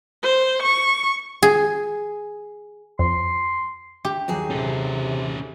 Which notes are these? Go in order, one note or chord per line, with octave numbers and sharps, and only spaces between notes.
C5
C#6
G#4
F2 C6
G4
D#2 F#3 G#4
C3 C#4 A4